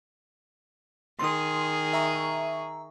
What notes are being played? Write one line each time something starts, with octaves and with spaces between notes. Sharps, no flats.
D#3 G#4 C6 D#6
E5 A#5 C#6